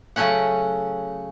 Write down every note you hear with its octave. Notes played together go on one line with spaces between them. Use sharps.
C#3 F#3 A3 C#4 F#5